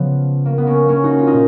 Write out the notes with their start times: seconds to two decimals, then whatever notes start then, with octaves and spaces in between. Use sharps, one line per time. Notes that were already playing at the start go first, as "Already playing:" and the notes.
Already playing: C#3 F3 B3
0.45 A#3
0.58 B3
0.67 A#3 C#4
0.88 A#3 C#4
1.04 D#4 F#4
1.18 F4
1.27 D#4
1.33 A#2